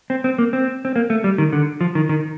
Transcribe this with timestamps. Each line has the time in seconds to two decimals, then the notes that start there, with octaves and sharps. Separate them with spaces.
0.10 C4
0.24 C4
0.38 A#3
0.53 C4
0.85 C4
0.96 A#3
1.10 A3
1.24 G3
1.38 D#3
1.53 D3
1.81 F3
1.95 D#3
2.09 D#3